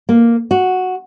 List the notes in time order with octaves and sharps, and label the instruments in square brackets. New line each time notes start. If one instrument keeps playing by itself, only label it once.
[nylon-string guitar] A#3
F#4